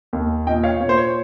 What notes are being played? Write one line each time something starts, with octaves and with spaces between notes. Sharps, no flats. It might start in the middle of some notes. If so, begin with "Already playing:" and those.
D#2
A#2 D#5 G5
C#5 F5
A#2 C#5
C5
C#5